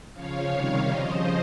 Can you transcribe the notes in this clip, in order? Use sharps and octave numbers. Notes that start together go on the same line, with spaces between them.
C#3 F3 C#5 F5
C3 D#3 G3 C#5 F5
C#3 F3 C5 D#5